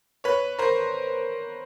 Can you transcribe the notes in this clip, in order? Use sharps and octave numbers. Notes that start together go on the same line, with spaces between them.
B4 C#5
A#4 C5